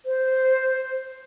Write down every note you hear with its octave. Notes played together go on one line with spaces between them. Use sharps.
C5